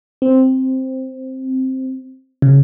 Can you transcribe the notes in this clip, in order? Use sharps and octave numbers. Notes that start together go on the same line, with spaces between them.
C4
C#3